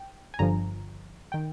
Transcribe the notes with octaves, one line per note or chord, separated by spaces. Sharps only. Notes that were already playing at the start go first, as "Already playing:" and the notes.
Already playing: G5
G#5
G1 G2 D3 F3 A#5
D#3 G5